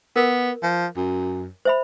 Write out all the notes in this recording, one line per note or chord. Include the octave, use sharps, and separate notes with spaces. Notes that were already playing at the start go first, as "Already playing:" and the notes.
B3 A#4
F3
F#2
C5 E5 B5